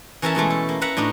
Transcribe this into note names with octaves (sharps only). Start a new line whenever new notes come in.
E3 C#4 E4 A#4 E5 A5
B2 E3 G#3 A3
A4
A#3
B4 E5 F#5 A#5
A2 D4 D#4 F#4